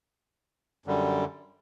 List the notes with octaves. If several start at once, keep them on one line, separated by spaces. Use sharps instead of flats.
F#2 D3 G3